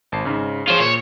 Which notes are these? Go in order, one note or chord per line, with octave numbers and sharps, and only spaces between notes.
G#1 A5 C7
G#2 C#3
F4 G#4 C5 C#5 F5
A#2 C#5